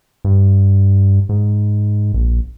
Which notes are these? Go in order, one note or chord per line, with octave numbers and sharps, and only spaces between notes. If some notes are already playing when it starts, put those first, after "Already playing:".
G2
G#2
A#1